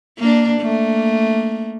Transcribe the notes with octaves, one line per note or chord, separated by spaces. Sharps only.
A#3 D4
A3 A#3